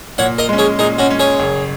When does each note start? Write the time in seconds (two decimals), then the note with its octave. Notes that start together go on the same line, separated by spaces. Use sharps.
0.18 A#2 C#5 F#5
0.38 A#4 D#5
0.49 G#3 C#4
0.58 G#4 C#5
0.79 A#2 D#4 G#4
0.98 C#4 F#4
1.09 G#3 C#4
1.19 G#4 C#5
1.39 F#1